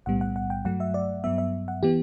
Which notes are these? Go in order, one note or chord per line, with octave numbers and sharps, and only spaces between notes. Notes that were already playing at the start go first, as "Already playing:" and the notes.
B1 A2 G3 B3 F#5
F#5
F#5
G5
G2 F#3 A3 F#5
E5
D5
G2 F#3 B3 E5
E5
F#5
E3 B3 G4